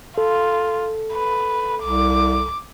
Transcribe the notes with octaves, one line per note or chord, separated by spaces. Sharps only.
F4 A4
B4
C2 D6